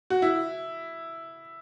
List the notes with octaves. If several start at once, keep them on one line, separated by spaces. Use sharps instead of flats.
F#4
E4